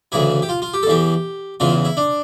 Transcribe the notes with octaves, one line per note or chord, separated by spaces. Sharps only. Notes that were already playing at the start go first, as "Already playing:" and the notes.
D2 C#3 E3 E4
G4
F4
F4
G4
A4
E2 E3 G4
E2 C#3 E3 F4
E4
D4